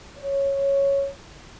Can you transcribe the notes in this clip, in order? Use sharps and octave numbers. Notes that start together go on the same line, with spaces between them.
C#5